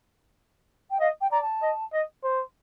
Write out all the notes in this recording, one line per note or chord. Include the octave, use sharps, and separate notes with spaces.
G5
D#5 F5
G5
D5 A#5
A5
D#5
D#5
C5